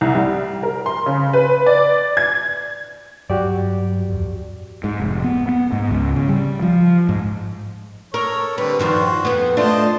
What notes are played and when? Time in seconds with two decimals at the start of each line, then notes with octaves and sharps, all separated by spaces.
0.01 C2
0.15 G3
0.63 A#4
0.86 C6
1.06 C#3
1.33 B4
1.66 D5
2.17 G#6
3.30 G2 F#3 F#4 G4 D5
4.08 D1 F2
4.84 G#2
4.99 F1
5.24 B3
5.49 B3
5.72 G#2
5.91 C#2
6.16 C#3
6.28 G3
6.62 F3
7.09 G#2
8.14 A4 A#4 C#5
8.58 D3 G3 C4 B4
8.79 G2 D#3 F3 F#4 C6
9.25 F2 B3
9.57 A3 D4 F4 C5 D#5 A5